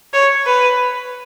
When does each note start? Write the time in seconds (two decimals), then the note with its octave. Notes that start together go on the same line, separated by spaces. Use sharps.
0.13 C#5
0.46 B4